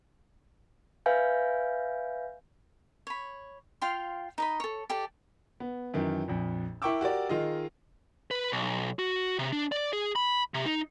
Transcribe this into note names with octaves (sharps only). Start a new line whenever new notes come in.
B4 E5 F5 G#5 G6
C#5 B5
F4 F5 G5 C6
D#4 D#5 B5
A4 C#5
G4 A4 D5
B3
F#2 D#3 E3
A#1 F2
E4 A#4 G5 C#6 D6 E6
F#4 G4 A#4 D5
D#3 F4 G#4 D#5
B4
B1
F#4
C3
D4
D5
G#4
B5
C3
D#4